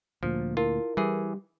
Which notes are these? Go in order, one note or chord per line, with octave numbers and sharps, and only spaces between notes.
D2 A#2 F3
E4 F4 A#4
E3 G3 G#4